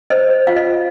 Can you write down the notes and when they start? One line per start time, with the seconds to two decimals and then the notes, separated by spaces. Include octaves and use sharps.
0.10 C5 D#5
0.29 C5
0.47 F4 F5
0.56 D#5
0.66 F4